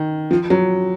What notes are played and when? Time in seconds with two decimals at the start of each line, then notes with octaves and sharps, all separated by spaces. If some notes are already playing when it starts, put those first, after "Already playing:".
Already playing: D#3
0.31 F3
0.50 F#3